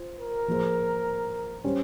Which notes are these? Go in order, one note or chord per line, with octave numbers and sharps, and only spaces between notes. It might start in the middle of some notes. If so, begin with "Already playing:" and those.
Already playing: F4 C5
A#4
F3 A#3 F4 G#4 C5
G3 C#4 G4 C5